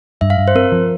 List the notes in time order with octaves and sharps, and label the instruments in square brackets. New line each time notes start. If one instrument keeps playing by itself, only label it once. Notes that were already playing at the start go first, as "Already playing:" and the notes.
[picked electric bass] G2 [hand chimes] E5
[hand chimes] F5
[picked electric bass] G2
[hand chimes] C5
[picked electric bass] C4 [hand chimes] A#4
[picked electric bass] F3